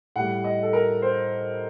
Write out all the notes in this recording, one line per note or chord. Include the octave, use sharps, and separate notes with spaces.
A2 G3 F#5
D#5
A4
A#4
C5